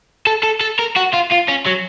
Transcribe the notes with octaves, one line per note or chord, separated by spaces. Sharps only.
A4
A4
A4
A#4
F#4
F4
F4
C#4
F#3